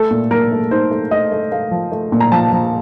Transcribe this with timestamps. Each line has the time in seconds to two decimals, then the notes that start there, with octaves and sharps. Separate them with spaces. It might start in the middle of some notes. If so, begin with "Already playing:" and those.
Already playing: A3 A4
0.11 A#2
0.31 A#2 A#4
0.52 A3
0.71 D#4 C5
0.91 A3
1.11 A3 D#5
1.32 A3
1.52 A3 F5
1.71 F3
1.92 A3
2.12 A#2
2.20 A#5
2.32 F3 A5
2.52 F3